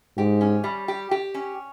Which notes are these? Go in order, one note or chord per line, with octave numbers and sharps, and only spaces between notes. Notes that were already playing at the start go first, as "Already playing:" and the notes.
G#2 G4
C#4
G3
G4
G4
C#4